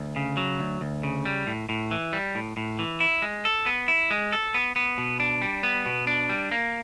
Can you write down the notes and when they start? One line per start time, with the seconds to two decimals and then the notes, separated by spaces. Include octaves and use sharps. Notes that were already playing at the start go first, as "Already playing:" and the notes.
Already playing: D2
0.16 C#3
0.37 F#3
0.59 D2
0.81 D2
1.03 C#3
1.25 G3
1.47 A2
1.69 A2
1.91 E3
2.13 G3
2.35 A2
2.57 A2
2.79 E3
3.00 E4
3.22 G#3
3.45 A4
3.66 B3
3.88 E4
4.11 G#3
4.32 A4
4.54 B3
4.76 B3
4.98 B2
5.20 D4
5.42 G3
5.63 B3
5.86 B2
6.07 D4
6.29 G3
6.51 A#3